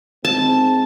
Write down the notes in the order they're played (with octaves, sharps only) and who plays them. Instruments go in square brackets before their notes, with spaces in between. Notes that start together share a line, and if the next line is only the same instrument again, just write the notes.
[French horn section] G#3 C4 D#4 [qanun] A5